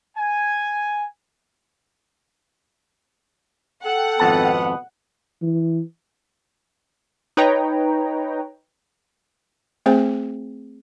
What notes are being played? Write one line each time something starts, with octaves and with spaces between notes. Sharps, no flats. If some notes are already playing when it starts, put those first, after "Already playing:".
G#5
A4 F#5 G5
G#1 F2 B2 B3 A5
E3
D#4 B4 C#5 G5 A#5
A3 C4 G#4 C5 G5